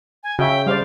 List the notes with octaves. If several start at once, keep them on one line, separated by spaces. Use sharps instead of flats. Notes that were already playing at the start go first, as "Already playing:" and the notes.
G#5
C#3 F#4 E5 G5
G3 C5 D5 F5